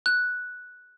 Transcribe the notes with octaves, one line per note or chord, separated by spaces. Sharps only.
F#6